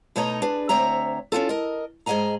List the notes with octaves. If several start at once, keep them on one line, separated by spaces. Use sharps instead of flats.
B2 A3 D#4 C#5 D#5 A#5
D4 G#4 B4
D2 C4 C#5 E5 A#5
C#4 D#4 F4 A4
A#4 D#5
G#2 G#4 D#5 E5 G#5 A#5